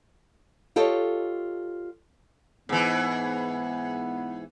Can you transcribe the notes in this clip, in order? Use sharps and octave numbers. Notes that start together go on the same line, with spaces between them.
F4 G4 A4 C#5 D#5
G#2 E3 B3